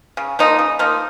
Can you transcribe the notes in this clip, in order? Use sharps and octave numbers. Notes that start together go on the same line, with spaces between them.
C#3
F3 A#3 D#4
C#3
F3 A#3 D#4